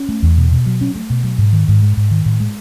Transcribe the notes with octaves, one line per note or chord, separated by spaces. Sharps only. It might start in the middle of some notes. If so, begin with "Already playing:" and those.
Already playing: C#4
A3
E2
B2
B2
F#3
C#4
A3
B2
F#3
G#2
D#3
G#2
G#3
G#2
D#3
A2
G#3